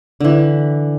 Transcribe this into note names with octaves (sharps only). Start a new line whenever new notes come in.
D3 E3